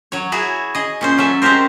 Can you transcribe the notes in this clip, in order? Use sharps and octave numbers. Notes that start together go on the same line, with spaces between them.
F#3 C#5
E4 F#4 G#4
G#4 D#5
A#2 C#4 C5
F#3 C#4 A4 E5
G#3 C4 C#4 G4 A#4 C5